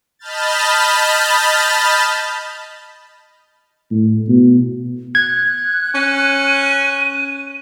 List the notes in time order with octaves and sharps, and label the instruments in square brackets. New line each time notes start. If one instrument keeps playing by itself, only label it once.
[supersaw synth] D#5 A5 B5 F6 G6 A6
[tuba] A2
B2
[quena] F#6 [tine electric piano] G#6
[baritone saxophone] C#4 [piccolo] D#7